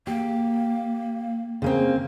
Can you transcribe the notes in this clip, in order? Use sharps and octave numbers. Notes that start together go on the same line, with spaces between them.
A#3 G4
C#3 A#3 C4